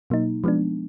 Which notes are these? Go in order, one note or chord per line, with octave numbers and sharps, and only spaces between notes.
B2 F#3 A#3 D#4
F3 G#3 B3 D4